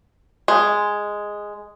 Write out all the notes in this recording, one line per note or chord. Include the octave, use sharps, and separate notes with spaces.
G#3